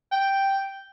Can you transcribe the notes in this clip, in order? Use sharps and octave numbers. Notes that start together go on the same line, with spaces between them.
G5